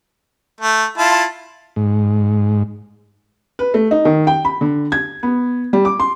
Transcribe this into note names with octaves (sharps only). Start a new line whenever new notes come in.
A3
E4 F4 A5
G#2
B4
A3
D#4
D#3
G5
B5
D3
G#6
B3
G3
D6
C6